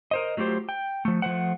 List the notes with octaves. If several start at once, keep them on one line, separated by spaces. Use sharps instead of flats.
A#4 C5 D#5
F#3 A3 F4 G4 C5
G5
F3 A3
F3 A3 C5 F#5